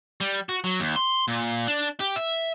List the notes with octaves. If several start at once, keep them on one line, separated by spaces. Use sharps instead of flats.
G3
F#4
F#3
D#2
C6
A#2
D4
G4
E5